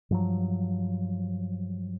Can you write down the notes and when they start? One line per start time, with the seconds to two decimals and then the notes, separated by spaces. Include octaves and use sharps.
0.10 G2 F3 F#3